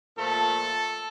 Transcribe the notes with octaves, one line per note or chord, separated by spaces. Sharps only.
A#2 F3 A3 A4